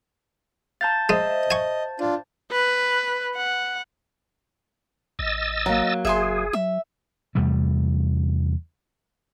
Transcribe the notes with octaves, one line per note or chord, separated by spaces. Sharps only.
F5 A5 A#5 C6 G6 A6
G#3 C5 D#5 E5
G#5 C#6
D4 F4
B4
F#5
A1 D#5 E6 A6
F#3 A#3 A#5
F#1 G#4 E5 G#5 C6
F#3 E5
E2 C3 G3 A3